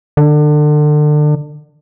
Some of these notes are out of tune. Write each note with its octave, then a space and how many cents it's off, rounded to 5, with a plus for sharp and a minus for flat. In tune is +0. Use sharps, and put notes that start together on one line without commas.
D3 +30